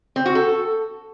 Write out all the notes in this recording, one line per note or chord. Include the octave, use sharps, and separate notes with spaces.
C4
F#4
A4